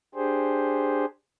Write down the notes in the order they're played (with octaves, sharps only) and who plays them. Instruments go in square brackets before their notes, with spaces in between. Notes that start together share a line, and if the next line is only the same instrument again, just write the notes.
[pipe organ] D4 G4 G#4 C5